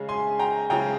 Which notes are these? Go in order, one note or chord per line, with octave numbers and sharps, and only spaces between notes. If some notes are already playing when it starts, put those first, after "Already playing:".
Already playing: C#3 G#3
G#5 C6
G5 A#5
C#3 G#3 G5 A#5